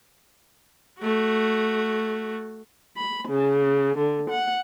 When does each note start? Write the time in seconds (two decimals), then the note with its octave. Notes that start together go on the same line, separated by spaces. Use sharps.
0.99 A3 F#4
2.96 B5
3.29 C#3
3.98 D3
4.31 F#5